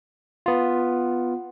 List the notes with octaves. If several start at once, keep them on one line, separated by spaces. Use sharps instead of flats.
B3 F4